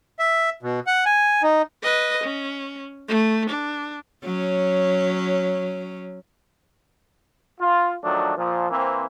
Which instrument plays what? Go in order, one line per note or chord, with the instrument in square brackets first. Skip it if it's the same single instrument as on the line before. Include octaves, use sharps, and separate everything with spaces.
[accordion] E5
B2
F#5
G#5
D#4
[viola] B4 D#5
C#4
A3
D4
[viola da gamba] F#3 C#4
[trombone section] F4
D#3 F3 F#3 A3 D4
A#2 F3
E3 A#3 C4